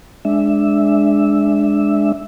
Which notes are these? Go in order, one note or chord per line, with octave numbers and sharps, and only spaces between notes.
G#3 D4 E5